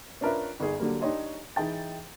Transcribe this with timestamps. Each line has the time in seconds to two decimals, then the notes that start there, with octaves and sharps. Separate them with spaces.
0.21 C#4 D4 F4 A#4 B4 E5
0.60 G1 D#4 G#4
0.80 D3 F#3 G3 A#3
1.01 D4 D#4 G4 C#5 D#5 C6
1.56 E3 D#4 G#4 G5 A6